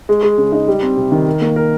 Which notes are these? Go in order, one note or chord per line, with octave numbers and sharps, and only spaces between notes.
G#3
G#3
C#3
D#4
G3
C4
C3
D#3
A#4
A#3
A#4